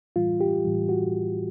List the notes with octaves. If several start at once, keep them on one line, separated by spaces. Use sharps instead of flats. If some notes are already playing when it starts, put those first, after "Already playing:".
A2 E3 G3 F4
G4
A2 E3 G3
F#4